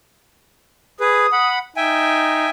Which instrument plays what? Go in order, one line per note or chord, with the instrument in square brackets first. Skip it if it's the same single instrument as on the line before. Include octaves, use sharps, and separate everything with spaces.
[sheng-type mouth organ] G#4 B4 [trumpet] D#6
[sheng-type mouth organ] F#5 B5
[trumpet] D#4 [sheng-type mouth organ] E5 G5 G#5